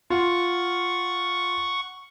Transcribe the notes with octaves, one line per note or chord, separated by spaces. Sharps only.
F4 F#5 C#6